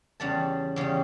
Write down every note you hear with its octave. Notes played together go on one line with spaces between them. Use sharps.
E2 C#3 G3 F#5 A5
E2 C#3 G3